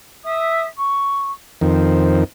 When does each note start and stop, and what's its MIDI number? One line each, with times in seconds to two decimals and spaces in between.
0.24 0.64 76
0.24 0.64 87
0.76 1.30 85
1.61 2.24 41
1.61 2.24 51
1.61 2.19 72